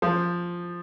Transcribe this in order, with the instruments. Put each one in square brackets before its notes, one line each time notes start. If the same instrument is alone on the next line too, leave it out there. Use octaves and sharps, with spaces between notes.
[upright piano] F3